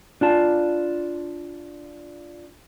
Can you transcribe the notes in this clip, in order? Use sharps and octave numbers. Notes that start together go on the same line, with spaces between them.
D4 F4 A5